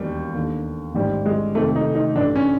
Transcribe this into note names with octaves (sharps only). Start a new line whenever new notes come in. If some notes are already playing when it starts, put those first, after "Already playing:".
Already playing: E1 D#2 D#3 G3
D#2 D3
A1 G#2 D#3 G3
G#3
F1 F2 C3 D#3 A3
D#4
D#4
A1 G2 D3 D4
C#4